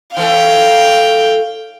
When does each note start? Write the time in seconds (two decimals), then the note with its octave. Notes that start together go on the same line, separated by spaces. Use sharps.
0.17 E3 A3 C#4 F5 G5